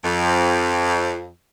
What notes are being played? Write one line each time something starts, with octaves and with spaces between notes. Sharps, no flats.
F2